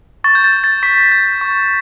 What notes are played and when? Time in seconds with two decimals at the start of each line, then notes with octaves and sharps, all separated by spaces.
0.24 C#6 A6
0.35 G6
0.44 A6
0.53 G6
0.64 A6
0.83 C#6 B6
1.12 G6
1.41 C#6